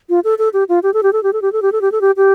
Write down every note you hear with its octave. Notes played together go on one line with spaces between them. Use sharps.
F4
A4
A4
G4
F4
G4
A4
G4
A4
G4
A4
G4
A4
G4
A4
G4
A4
G4
G4